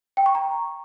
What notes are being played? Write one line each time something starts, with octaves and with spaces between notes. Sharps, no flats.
G5
C#6
A#5